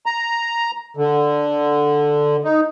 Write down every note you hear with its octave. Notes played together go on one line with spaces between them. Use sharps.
A#5
D3
D#4